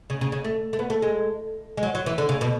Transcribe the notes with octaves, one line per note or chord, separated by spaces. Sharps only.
C#3
C#3
C#3
A3
A3
B3
A3
G#3
G#3
F#3
F#3
E3
D3
C#3
B2